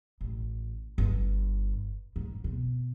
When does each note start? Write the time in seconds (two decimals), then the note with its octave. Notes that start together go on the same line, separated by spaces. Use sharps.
0.21 A1
0.98 G1
2.16 G#2
2.44 B2